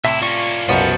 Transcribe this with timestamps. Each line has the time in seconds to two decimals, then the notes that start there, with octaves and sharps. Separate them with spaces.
0.05 C2 A2 C3 E4 E5
0.22 A#3 C#4 F4 D5 C#6
0.69 C2 F#2 B2 F3 B3 F#4 A4 D#5